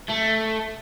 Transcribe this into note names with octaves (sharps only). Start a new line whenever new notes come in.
A3